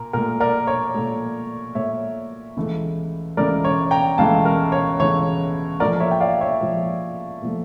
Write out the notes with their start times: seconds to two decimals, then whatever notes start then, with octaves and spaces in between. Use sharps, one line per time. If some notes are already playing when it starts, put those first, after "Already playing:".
Already playing: A#2 A#4
0.13 A#2 A3 A#4
0.40 A#4 D5
0.67 C#5
0.94 A#2 A3
1.75 A#2 A3 C#5 E5
2.57 C#2 C#3 E3 A3
3.37 C#2 C#3 E3 A3 A#4 D5
3.65 C#5
3.91 G5 A#5
4.18 C#2 C#3 E3 A3 F5 A5
4.45 A#4
4.72 C#5
5.00 C#2 C#3 E3 A3 C#5
5.80 A#2 F3 A3 A#4 D5
6.00 C#5 E5
6.11 G5
6.20 D5 F5
6.41 C#5 E5
6.61 A#2 F3 A3
7.42 A#2 F3 A3